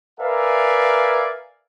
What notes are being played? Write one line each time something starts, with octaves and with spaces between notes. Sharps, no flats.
A#4 B4 D5 E5 F5 G#5